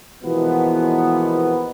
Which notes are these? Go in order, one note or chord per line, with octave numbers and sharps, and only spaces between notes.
B2 E3 F3 G#3 A#3 B3